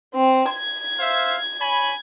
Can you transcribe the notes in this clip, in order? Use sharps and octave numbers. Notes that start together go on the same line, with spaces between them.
C4
G#6
C5 E5 F5
C#5 G#5 B5